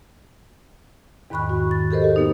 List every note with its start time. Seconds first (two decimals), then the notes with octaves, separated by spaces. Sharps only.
1.30 E2 G#2 D#3 B5 C#6 F#6
1.50 F#4
1.71 A6
1.91 G4 A4 A#4 C5 D#5
2.02 G4 A4
2.16 A#3 B3 D#4